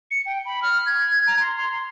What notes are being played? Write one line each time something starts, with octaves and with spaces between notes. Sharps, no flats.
C#7
G5
B5
F6
G#6
A#5
C6
C6
C6